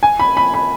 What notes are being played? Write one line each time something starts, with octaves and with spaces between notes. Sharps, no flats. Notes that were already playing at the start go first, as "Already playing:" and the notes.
G#5
B5
B5
B5